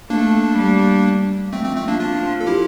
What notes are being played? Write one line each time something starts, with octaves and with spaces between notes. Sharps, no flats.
A3 A#3 D4
G3
F3 A3 C4
A3 C4
A3 C4
A#3 D4
D4 F4
A4
E4 G4